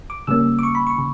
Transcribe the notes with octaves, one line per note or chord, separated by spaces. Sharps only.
D6
C#3 G3 A#3 C#4 E6
D6
C#6
B5
C#6
C#3